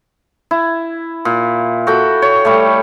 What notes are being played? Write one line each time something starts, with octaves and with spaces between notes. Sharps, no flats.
E4
A#2
F#4 A4 G5
C#5
G3 A3